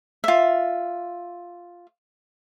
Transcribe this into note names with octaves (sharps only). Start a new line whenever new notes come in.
F4 E5